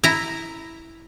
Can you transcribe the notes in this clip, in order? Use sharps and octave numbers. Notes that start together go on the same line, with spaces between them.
E4 A#5